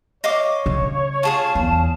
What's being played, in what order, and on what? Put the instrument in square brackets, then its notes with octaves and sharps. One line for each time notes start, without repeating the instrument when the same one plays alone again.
[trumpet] C#5 [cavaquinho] D#5 F5 D6
[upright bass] C#3
[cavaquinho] F4 G#4 F5 [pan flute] A5
[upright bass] E2